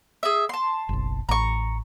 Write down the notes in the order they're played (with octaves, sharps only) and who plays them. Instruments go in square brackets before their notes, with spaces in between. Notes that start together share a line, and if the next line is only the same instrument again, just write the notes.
[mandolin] G#4 E5
A5 C6
[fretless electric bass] F#1 B1
[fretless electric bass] A1 [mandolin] A#5 C#6